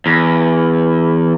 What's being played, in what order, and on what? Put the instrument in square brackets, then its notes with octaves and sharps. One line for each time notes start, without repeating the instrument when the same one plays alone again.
[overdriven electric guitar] E2